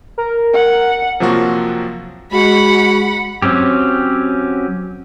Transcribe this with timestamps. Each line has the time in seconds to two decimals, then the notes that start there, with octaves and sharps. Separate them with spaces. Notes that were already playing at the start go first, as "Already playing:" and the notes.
0.18 A#4
0.54 F#5
1.20 C3 F3 F#3 A#3 F4 F#4
2.32 G#3 F#4 F#5 B5
3.42 F#3 C4 C#4 G4